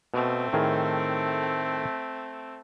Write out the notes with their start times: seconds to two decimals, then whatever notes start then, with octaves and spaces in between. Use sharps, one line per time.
0.14 B2 A3 C4
0.53 A2 D#3 G#4